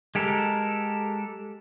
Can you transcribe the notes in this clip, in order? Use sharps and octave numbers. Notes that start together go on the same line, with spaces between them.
G#3 G4 A4 A#4